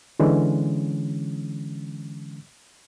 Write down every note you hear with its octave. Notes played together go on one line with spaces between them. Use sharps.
D3 E3 G#3 C#4